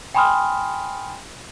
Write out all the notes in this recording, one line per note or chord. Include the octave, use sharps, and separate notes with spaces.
G5 G#5 B5 C6 D#6 F6